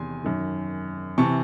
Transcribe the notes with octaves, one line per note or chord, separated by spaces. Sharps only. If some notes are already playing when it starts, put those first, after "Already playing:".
Already playing: E2 C3 D#3 G#5 C6
F#2 D#3
C3 E3 A5 C#6